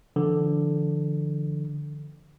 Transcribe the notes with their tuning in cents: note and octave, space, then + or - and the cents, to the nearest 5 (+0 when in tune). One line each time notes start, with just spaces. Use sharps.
D3 +0 F3 -45